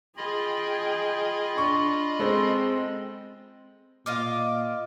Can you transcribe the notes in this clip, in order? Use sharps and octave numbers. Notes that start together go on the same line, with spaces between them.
F4 G#4 D#5 G5 B5
D4 C#6
G#3 C4 A4 C5
A#2 F4 D#5 F5 D6